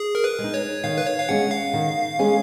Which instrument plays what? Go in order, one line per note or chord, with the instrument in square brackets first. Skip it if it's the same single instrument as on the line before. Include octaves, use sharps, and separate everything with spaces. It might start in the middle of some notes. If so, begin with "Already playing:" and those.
Already playing: [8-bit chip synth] G#4
A#4
B4
[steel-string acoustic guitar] G#3
D#4
[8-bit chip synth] C#5
[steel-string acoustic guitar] D#3 [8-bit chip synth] F5
[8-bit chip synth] B4
C#5
F5
[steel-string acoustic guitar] G#3 C#4 G#4 [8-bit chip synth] F#5
[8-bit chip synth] F5
[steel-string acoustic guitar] D#3
G#3 C#4 G#4